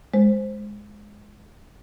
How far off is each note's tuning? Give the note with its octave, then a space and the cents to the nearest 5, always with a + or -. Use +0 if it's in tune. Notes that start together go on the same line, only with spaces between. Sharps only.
G#3 +0 C5 +0